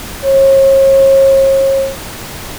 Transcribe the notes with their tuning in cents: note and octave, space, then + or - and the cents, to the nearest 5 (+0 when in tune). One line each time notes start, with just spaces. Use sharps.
C#5 -40